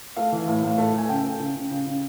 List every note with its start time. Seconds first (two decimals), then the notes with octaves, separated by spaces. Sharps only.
0.16 A3 F5
0.32 E3
0.48 A2
0.63 A2
0.78 A3
0.94 A3 G#5
1.09 C#3 G5
1.25 A3
1.40 C#3
1.56 C#3
1.71 C#3
1.86 C#3